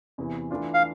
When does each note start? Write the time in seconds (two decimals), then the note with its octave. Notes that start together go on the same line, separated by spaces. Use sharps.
0.18 E2 C3 E3
0.51 E3 A3 D4 F4
0.74 F5